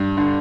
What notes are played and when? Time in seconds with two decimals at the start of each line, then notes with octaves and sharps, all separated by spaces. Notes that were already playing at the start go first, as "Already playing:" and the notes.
Already playing: G2
0.17 D3